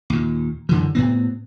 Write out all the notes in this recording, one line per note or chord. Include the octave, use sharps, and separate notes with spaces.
D#2 A#2
F#2 D3 E3
A2 B3 C4